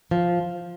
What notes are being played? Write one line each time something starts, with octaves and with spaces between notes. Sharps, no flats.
F3